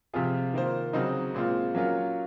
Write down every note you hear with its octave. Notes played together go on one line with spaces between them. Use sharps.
C3 F3 C4 F4 G#4
D#3 A#3 F4 C5
C#3 F#3 C4 D#4
A#2 G#3 C4 F4
F#3 A#3 C#4 F4